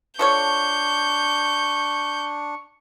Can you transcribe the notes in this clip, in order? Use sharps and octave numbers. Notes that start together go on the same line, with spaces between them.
F3 D4 A4 C#5 C#6 G6